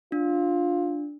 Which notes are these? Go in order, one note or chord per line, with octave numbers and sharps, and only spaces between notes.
D4 F4